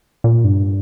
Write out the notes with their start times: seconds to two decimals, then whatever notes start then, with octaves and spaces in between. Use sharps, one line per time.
0.24 A#2
0.44 G2